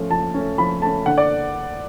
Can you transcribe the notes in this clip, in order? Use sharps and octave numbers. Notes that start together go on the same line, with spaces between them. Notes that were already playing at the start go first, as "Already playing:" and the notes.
Already playing: F3 A3 C#4
F3 A5
A3 C#4
F3 B5
A3 C#4 A5
D3 F#5
D5